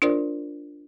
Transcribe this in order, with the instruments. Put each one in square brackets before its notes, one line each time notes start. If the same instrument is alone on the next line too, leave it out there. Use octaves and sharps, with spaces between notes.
[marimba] D4 F4 A#4 C5 D5